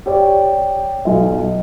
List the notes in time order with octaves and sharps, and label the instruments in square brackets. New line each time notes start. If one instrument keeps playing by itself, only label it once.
[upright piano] G4 C#5 D5
B1 D#5